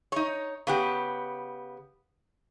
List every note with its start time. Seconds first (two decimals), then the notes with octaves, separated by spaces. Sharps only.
0.12 D#4 C#5
0.67 C#3 B3 G4